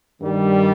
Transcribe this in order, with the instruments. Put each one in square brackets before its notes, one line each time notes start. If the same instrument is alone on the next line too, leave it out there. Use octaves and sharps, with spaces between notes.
[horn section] G2 D#3 G3